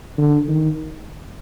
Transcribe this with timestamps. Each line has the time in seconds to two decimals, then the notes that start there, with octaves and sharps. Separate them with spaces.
0.18 D3
0.48 D#3